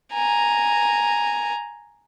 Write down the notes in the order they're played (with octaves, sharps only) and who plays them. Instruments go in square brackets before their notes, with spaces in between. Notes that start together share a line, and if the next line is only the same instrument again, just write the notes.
[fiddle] G#5 A#5